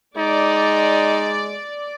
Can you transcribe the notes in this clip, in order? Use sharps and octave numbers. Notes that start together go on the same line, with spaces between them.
G#3 D#4 D5